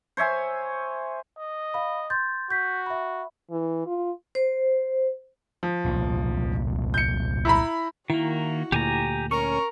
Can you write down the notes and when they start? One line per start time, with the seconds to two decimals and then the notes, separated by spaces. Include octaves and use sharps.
0.17 C5 C#5 E5 G#5
1.38 D#5
1.74 F5 B5
2.10 C6 G6 A6
2.50 F#4 G6 B6
2.86 E5 B5
3.51 E3
3.86 F4
4.35 C5
5.63 F3
5.85 E1 C2 A#2
6.94 G6 C#7
7.45 E4 A#5 B5
8.10 D#3 A#3 E4 F#4
8.72 D2 A#2 G4 G#5 A#5
9.31 C#4 A#4 C#6